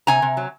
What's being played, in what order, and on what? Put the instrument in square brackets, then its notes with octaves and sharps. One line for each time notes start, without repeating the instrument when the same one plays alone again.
[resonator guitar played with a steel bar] C3 G#5 A#5
C3
F#3